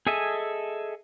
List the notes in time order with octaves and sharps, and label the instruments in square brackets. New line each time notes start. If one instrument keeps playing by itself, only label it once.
[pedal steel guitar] G#4 A4 D#5 E5 G#5